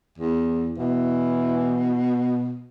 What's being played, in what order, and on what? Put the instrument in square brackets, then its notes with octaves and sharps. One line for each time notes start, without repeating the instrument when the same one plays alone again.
[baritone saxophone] E2
[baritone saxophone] B2 [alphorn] E3